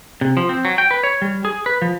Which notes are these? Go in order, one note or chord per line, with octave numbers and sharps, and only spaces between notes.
C3
F3
C4
F#3
G5
B4
C#5
G3
G#4
B4
F3